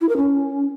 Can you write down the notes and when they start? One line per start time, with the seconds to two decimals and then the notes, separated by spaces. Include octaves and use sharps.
0.01 E4
0.09 A#4
0.17 C#4